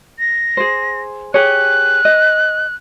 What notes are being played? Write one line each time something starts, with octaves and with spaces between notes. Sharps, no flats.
A#6
G#4 C5
G4 G#4 C#5 F#6
D#5